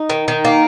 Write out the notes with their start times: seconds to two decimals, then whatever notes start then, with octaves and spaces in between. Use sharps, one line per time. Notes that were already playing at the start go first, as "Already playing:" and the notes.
Already playing: D#4
0.10 D#3
0.28 D#3
0.45 A#3